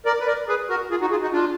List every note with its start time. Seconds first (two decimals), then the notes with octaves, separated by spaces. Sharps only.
0.06 A#4 D5
0.20 B4
0.27 A#4 D5
0.48 G#4 B4
0.69 F#4 A#4
0.90 F4 G#4
1.01 D#4 F#4
1.11 F4 G#4
1.22 D#4 F#4
1.32 D4 F4